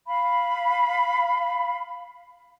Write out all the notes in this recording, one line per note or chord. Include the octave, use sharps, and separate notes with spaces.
F5 B5